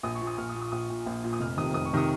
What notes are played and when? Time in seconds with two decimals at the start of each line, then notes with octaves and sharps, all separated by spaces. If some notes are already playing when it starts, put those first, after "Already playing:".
0.03 A#1 D#6
0.15 C#6
0.22 A#2
0.27 D#6
0.38 A#1 F6
0.49 D#6
0.55 A#2
0.61 D#6
0.72 A#1 D#6
0.90 A#2
1.06 A#1
1.24 A#2
1.33 D#6
1.40 F1 F6
1.57 F2 C3 D#3 D#6
1.74 F1 D#6
1.86 C#6
1.93 C3 D#3 D#6